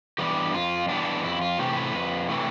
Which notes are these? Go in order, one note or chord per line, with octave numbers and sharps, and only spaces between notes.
E3 G3 B3 D4 G4
F2 F4
E3 G3 B3 D4
F2 E4
F4
C3 E3 A3 G4
B4
F2
C3 E3 A3